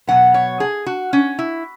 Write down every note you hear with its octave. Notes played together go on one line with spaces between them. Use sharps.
B2 F#3 B3 F#5
C#5
G#4
F#4
C#4
E4